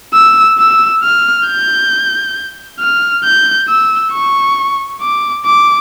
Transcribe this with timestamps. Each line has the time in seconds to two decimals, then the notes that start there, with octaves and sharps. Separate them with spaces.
0.14 E6
0.58 E6
1.03 F6
1.47 G6
2.80 F6
3.24 G6
3.68 E6
4.12 C#6
5.01 D6
5.45 D6